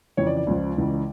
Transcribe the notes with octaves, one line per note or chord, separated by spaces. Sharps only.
F2 C#3 E3 C#5
D5
D5
C#2 C#3 F3
C#2 C#3 E3